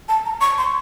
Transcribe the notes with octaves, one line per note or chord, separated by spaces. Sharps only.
A5
A#5
C#6
C6